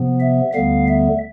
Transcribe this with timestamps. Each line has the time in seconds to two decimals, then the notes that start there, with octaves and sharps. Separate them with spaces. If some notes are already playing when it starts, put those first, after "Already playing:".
Already playing: C3 F3 B3
0.20 E5
0.54 D2 D3 G3 B3 F5
0.88 E5